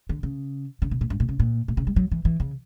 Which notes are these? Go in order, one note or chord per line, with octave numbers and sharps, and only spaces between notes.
D3
C#3
C#3
B2
A#2
G2
A#2
C#3
A#2
A#2
C#3
G3
F#3
E3
E3
C#3